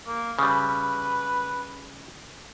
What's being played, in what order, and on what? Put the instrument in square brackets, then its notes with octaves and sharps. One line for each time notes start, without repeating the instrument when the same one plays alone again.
[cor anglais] A#3
[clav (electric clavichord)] C#3 G3 [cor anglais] B4